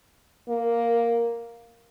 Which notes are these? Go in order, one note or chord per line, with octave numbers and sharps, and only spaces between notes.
A#3